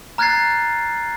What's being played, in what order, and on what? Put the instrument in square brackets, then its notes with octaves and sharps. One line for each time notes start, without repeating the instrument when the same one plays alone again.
[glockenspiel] A#5 F6 F#6 G#6 A6 C7